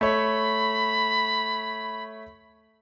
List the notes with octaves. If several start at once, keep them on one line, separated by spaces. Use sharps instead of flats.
A3 C#5 B5